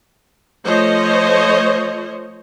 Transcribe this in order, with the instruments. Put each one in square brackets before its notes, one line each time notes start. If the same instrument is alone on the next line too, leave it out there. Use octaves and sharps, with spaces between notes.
[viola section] F3 A3 C5 C#5 D#5